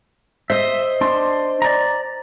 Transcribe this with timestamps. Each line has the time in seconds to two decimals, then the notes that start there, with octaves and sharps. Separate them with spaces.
0.50 C5 D#5 E5
1.01 D4 C6
1.62 D5 A#5